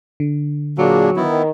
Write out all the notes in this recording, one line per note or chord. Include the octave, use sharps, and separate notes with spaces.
D3
A#2 F#3 A#3 D4 G#4
D#3 B3 E4